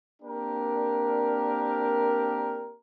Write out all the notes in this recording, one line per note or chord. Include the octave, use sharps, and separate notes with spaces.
A#3 C4 D4 G4 A#4